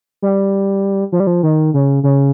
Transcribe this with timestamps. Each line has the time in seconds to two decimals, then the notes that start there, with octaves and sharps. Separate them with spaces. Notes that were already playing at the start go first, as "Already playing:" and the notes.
0.22 G3
1.12 F3
1.20 G3
1.27 F3
1.43 D#3
1.74 C#3
2.03 C#3